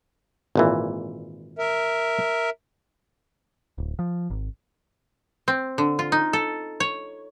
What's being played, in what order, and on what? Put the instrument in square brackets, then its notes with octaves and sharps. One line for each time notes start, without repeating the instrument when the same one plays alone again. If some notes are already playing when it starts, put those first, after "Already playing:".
[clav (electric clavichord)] G#1 A#2 E3
[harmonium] A#4 E5
[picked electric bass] D1
F3
G#1
[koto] C4
D3
F4
D#4
A4
C#5